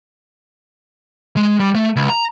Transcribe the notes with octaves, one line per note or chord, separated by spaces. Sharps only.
G#3
G3
A3
C#2
A#5